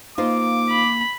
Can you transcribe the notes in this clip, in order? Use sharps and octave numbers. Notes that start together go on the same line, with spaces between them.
A#3 D#4 F4 C5 D6
B5